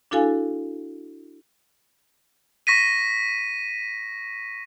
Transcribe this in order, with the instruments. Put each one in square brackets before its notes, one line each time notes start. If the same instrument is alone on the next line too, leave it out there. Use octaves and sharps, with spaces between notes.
[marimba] D4 E4 F#4 A4 F5 G#5
[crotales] C#6 A#6 B6 D#7